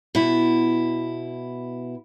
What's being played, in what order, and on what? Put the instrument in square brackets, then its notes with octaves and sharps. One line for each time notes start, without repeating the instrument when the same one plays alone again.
[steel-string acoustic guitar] B2 E4